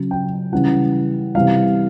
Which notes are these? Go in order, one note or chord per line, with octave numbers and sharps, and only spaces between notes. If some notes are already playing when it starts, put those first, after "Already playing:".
Already playing: C#3 F#3
G5
C#3 E3 G3 F#5
C3 E3 G3 F5